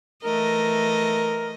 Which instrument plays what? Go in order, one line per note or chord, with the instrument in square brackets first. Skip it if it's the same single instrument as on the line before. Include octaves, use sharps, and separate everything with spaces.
[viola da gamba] E3 A3 D#5 [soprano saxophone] A#4